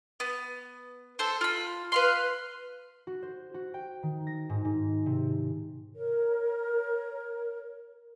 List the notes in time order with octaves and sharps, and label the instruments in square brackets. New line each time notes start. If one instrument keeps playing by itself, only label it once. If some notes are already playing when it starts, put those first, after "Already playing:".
[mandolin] B3
A4 C5
F4 B5
B4 F5 C6
[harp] F#4
C5
F#4
G5
D#3
A#6
G#2
G#2
C3
[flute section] A#4 C#5